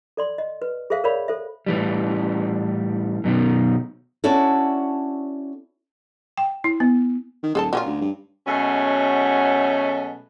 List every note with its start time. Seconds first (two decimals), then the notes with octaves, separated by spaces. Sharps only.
0.17 A4 D5 C6
0.38 D#5
0.62 B4
0.90 G#4 A4 C5 E5 F5
1.04 A#4 C#5 D5 F5 B5
1.28 A4 C5 E5
1.66 A2 E3 G3
3.24 F#2 B2 D#3
4.24 C#4 D4 E4 F#4 A4
6.38 G5
6.64 E4
6.80 B3
7.43 D#3
7.55 D#1 G#4 A4 A5
7.73 A#2 F#3 C#4 F4
7.86 D2
8.01 G2
8.47 B2 F#3 G#3 A3 C#4